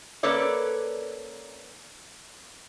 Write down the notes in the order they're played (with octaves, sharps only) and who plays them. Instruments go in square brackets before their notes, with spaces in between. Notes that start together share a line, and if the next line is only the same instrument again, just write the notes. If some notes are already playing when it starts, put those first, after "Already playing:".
[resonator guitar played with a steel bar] A#3 C#4 A4 B4 C#5 D5